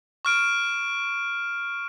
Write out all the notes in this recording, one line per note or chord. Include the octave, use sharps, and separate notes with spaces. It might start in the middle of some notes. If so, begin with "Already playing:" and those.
C#6 F6 D7